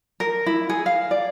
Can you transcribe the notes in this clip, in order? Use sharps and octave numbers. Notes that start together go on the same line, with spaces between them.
A#4
E4
G#4
F5
D5